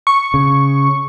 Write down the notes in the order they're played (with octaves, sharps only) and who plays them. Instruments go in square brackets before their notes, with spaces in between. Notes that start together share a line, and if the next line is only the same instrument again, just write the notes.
[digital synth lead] C#6
[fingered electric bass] C#3